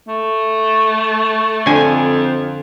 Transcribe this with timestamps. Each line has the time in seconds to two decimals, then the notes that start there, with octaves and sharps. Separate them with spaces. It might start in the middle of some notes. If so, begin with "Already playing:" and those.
0.08 A3
1.66 F2 D3 G#5